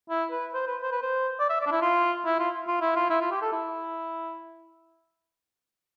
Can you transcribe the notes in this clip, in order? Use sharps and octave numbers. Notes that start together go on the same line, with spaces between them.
E4
B4
C5
B4
C5
B4
C5
D5
E5
D5
D4
E4
F4
E4
F4
F4
E4
F4
E4
F4
G4
A4
E4